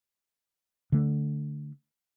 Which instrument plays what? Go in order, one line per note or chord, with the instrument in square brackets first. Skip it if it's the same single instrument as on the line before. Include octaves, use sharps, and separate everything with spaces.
[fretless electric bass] D3 A3